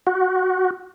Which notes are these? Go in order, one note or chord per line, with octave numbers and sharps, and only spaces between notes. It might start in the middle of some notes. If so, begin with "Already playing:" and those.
F#4